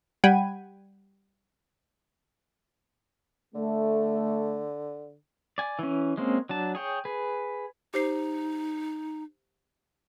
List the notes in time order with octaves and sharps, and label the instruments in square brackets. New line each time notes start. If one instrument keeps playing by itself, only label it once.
[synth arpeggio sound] G3 F#5 G5 B5 G#6 D#7
[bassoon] D3 [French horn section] A3
[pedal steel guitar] D5 G#5
E3 C#4
G#3 A#3 C4 C#4
F#3 D4 A5
G#4 C#5 G5
G#4 B4
[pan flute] D#4 [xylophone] G4 C5 C7